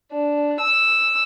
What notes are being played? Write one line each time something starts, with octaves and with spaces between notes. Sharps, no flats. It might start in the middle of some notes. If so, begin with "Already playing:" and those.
D4
E6